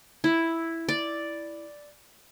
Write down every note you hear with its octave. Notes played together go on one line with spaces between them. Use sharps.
E4
D5